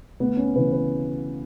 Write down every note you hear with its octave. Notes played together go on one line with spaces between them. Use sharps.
D2 B3
C#4
C#3 E3 B4
B4